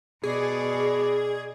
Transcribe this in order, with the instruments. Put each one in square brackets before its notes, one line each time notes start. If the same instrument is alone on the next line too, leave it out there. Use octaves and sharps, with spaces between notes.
[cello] B2 D5 [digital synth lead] G#4